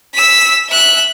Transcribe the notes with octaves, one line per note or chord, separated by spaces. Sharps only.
E6 B6
E5 F#6